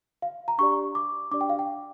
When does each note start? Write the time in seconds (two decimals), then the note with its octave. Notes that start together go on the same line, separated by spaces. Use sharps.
0.22 F5
0.48 A#5
0.58 D4 G4 D5 C#6
0.95 D6
1.31 D4 G4 D5 D6
1.41 G5
1.49 F5
1.59 G5